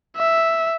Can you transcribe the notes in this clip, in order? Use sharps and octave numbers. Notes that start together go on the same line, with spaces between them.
E5